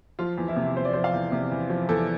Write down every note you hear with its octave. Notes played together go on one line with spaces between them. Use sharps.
F3 F4
E2
E4
C3
E2 C5
D5
F3 C5
F5
E2
C3
E2
F3
E2 A4